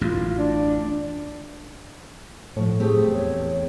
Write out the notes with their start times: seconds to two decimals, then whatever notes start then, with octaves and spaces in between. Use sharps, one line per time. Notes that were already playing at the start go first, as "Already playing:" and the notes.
0.01 A1 F#2 F4
0.38 D4
2.56 A2 F3 C#5
2.80 A3 C4 G4 G#4
3.12 E2 C#5